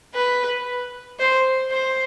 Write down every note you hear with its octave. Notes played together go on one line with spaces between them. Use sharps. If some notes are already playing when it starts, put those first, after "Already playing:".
B4
C5
C5